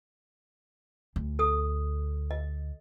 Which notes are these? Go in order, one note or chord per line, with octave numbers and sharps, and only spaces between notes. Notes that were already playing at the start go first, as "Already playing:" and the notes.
D2
A4 D#6
D#5